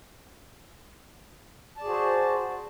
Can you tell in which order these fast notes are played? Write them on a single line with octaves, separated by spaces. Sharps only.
A5 D5 G#4 F#4 C5